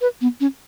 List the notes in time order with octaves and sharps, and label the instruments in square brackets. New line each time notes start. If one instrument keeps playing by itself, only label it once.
[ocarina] B4
B3
C#4